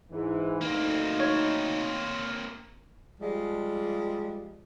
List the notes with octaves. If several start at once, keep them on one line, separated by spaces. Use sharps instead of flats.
G#2 E3
D2 A#3 C4 D#4
C#5
F3 G3 G#3